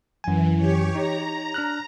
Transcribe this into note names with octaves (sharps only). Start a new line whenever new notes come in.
F#2 E3 G#5
G4 C#5
D#4 A#5
D4 F6 F#6